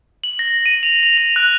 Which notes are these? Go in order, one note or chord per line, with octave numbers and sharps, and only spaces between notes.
F#7
A#6
D#7
F7
F7
F7
F#6